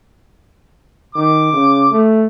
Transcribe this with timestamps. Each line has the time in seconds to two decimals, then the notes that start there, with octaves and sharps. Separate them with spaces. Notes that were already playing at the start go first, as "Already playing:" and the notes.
1.15 D#3 D6
1.53 C#3
1.92 A3